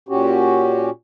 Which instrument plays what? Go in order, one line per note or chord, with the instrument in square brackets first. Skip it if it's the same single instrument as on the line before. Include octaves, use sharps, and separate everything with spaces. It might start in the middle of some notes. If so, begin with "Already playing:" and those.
[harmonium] A#2 C#4 F#4 G4